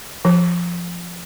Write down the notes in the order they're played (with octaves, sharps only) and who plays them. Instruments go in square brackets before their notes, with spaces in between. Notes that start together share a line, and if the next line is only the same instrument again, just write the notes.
[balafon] F3